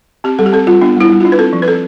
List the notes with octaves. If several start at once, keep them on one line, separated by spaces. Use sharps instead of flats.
C4 G4
G3 A4
G4
C4 A4
G3 F4
B3 D4
G3 E4
G3
D4 F4
B4
C4 A4
F3
B4
C4 A4